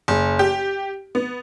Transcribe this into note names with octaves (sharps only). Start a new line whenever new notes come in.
F#1
G4
B3